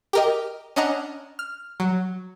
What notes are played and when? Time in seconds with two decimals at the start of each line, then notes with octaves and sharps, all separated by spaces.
0.13 G4 A#4 D#5
0.76 C#4 D4 D#5 F#5 A#5
1.39 F6
1.80 F#3